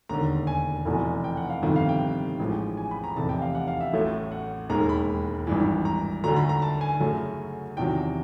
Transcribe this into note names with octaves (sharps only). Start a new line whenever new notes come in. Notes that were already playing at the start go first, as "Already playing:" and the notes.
E1 D#2 D3 A#5
G#5
F1 E2 B2 G#5
G5
F#5
F5
G1 F2 C3 D#3
F5
G5
A1 G#2 F3 G#3
G#5
B5
A#5
F1 E2 C3 E3 A5
G5
F5
F#5
F5
E5
A1 A2 F#3 A3
F#5
E1 D#2 D#3 G#3 A#5
B5
G#1 G2 E3
A#5
D2 D3 F#3 A3 A#5
B5
A#5
A5
G#5
F#2 C#3 F#3 A3
E2 C3 D#3 F#3 G5